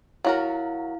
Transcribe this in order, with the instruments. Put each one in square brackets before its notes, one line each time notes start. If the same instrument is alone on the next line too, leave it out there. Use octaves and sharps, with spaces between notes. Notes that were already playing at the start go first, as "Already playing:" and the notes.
[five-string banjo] F#3 F#4 A#4 [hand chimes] E4 F5